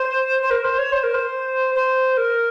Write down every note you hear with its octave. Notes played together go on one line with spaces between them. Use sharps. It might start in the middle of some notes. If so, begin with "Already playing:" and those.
Already playing: C5
C5
A#4
C5
C#5
C5
A#4
C5
C5
A#4